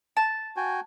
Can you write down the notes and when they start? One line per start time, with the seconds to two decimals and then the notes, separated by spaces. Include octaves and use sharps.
0.17 A5
0.57 F#4 G5 G#5